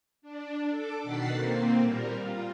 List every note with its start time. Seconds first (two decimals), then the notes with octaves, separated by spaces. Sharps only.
0.22 D4
0.70 A4 D6
1.03 B2 D#3 F#5 A6 B6 C7
1.33 A#3 C4
1.81 A#2 G3 A#4
2.14 F4